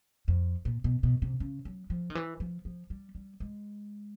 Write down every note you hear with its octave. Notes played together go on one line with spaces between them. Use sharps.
F2
A#2
B2
B2
C3
C#3
F#3
F3
D#3
E3
F3
F3
G3
G3
G#3